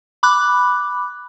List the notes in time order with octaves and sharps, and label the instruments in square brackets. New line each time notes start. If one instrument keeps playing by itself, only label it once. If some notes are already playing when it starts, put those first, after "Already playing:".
[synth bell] B5 D6 F#6